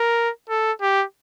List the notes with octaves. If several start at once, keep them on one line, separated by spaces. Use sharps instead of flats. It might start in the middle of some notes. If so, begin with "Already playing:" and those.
Already playing: A#4
A4
G4